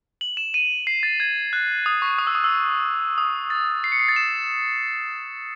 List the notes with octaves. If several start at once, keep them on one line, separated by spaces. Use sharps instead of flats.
F#7
E7
D#7
C7
A6
G#6
F#6
D#6
C#6
D#6
E6
D#6
E6
D#6
A6
C7
C#7
C7
A6
E7